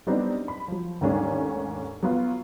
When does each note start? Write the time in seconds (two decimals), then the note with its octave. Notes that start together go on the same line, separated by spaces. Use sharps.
0.07 F#3 G3 B3 C4 D4 D#4
0.48 B5
0.68 F3 F#3
1.01 D#2 G#2 G3 A3 C#4 D4
2.03 F#3 B3 F4